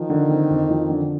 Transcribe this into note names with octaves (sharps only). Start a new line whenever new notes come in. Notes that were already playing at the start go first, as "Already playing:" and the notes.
Already playing: D#3 F3
D3
C4
F2
F3
D3